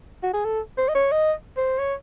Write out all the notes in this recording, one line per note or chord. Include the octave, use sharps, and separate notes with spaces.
F#4
G#4
A4
C5
D#5
C#5
D#5
C5
C#5